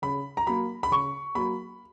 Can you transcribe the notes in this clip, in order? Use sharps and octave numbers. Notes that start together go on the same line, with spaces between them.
C#3 B5
A#5
F#3 A#3 B5
B5
C#3 C#6
F#3 A#3 B5